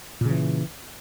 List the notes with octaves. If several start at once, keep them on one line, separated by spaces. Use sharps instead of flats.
A#2 C#3 E3